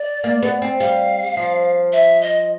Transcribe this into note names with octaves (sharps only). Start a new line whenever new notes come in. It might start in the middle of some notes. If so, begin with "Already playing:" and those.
Already playing: D5
A#3
B3
C4
G3 F5
F3
E5
D#5